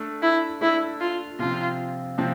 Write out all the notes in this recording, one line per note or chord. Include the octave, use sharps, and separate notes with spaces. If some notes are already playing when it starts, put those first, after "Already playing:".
Already playing: A3 D4 A4 D5
E4
A3 D4 E4 A4 D5
F4
C3 F3 C4 F4
C3 F3 C4